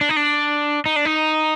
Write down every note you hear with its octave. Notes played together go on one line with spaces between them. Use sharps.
D4
D#4
D4
D#4
D4
D#4